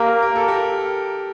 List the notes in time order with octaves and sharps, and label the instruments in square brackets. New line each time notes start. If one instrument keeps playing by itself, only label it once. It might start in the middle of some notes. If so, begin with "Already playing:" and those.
Already playing: [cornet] A#3 [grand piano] G4 A#4
[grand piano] A#4
A4
G4 A#4